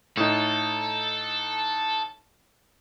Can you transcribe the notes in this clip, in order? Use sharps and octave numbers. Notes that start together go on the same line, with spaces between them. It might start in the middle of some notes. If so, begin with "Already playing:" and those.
A2 D#4 A4